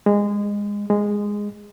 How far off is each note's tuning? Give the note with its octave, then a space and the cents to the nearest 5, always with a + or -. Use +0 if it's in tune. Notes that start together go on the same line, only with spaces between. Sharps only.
G#3 -20
G#3 -10